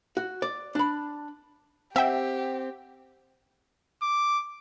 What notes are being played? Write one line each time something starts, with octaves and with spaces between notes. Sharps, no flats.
F#4
D5
D4 B5
C4 G4 E5 F#5 G5
D6